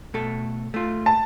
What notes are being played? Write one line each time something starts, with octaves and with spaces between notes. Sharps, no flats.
B2 A3 A4
A3 F4
A5